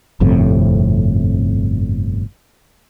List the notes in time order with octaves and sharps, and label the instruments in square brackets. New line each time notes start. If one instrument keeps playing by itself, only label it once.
[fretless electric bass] G1 F2 A2 C3